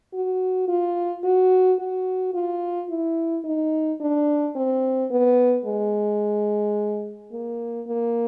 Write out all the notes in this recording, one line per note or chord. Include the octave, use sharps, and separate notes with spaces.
F#4
F4
F#4
F#4
F4
E4
D#4
D4
C4
B3
G#3
A#3
A#3